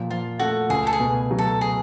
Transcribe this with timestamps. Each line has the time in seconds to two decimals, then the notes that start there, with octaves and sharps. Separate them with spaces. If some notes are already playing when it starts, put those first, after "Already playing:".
Already playing: A#2 F3
0.11 F3 F4
0.39 A3 F#4
0.70 C#2 G#4
0.87 A4
0.93 G#4
1.00 B2
1.31 F#3
1.38 A4
1.61 G#4